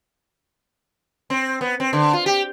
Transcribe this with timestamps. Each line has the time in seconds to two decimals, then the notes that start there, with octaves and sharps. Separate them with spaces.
1.30 C4
1.61 B3
1.80 C4
1.93 D3
2.13 F4
2.26 G4